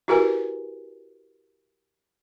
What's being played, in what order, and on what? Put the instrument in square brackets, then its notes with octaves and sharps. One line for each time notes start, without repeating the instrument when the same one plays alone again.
[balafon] E4 F#4 G4 A#4 B4 G#5